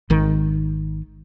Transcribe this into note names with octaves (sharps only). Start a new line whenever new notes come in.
G#1 D#3